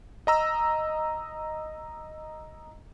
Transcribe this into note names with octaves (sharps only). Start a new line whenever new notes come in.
D#5 A#5 E6